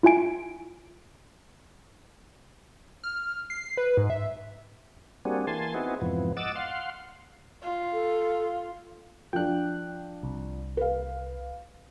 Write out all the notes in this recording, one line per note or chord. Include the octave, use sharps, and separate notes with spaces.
E4 F4 E5 G#5 D7
F6
C7
B4
G#2
E5
G3 A#3 C4 D4 F#4 G#4
E3 A#3 G#5 A5 C6
B3 C4 D#4 E4 F#4 G#4
F2 G#2 C3 E3 F3 B3
D#5 F#5 D6 E6 A6
F5 F#5 C6
F4
A4
F3 D4 G5 F#6
C2
B4 F5